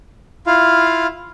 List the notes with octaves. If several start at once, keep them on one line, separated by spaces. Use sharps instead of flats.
E4 F4 F5